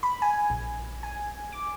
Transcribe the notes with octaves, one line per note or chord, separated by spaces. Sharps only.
B5
G#5
A#1
G#5
D6